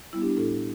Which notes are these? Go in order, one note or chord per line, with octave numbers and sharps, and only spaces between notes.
G3 B3 E4
D4 G4
A2 E4 A4